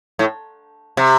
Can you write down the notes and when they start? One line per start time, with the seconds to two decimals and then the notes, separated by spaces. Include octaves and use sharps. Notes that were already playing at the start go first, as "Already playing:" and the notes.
0.19 A2
0.97 C3